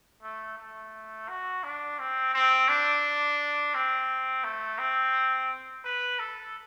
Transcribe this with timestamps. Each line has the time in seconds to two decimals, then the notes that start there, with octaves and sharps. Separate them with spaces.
0.23 A3
0.58 A3
1.29 F#4
1.64 D4
1.99 C4
2.34 C4
2.69 D4
3.74 C4
4.44 A3
4.79 C4
5.85 B4
6.19 A4